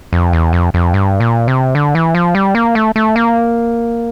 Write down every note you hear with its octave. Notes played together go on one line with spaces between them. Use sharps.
F2
E2
F2
F2
G2
A#2
C3
D3
E3
F3
G3
A#3
A3
A3
A#3